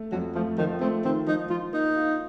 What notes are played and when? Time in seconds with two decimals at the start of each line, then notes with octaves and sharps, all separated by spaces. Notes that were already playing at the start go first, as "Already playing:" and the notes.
Already playing: A3
0.12 F2 F#3
0.34 F3 A3
0.58 D#3 F3
0.81 A3 C4
1.05 D#3 C4
1.27 F3 D#4
1.50 F3 F4
1.73 A#3 D#4
1.96 F4